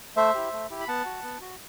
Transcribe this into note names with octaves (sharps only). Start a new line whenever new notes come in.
A3 C5 E5
E4 G4
A3
E4 G4
B5
B3 F#5 A5
F#4
B3
F#4